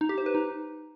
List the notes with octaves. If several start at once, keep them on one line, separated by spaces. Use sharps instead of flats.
D#4
G4
C5
B4
D#4